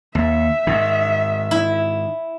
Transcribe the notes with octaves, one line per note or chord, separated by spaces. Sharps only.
D#2 E5
G#2 D#3
E4